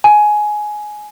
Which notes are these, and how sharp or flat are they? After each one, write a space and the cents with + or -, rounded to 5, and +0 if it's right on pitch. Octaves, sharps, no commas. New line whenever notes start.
G#5 +15